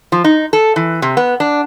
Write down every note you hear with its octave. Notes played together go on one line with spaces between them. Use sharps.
F3
D#4
A4
E3
C3
B3
D4